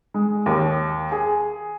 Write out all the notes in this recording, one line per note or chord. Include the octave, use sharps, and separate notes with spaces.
G#3
D#2
G#4